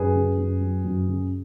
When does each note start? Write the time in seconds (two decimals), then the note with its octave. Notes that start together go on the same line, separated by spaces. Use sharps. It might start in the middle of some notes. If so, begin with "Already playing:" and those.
Already playing: F#2 G#4 B4
0.14 C#3
0.38 F#2
0.61 F#3
0.85 F#2
1.08 C#3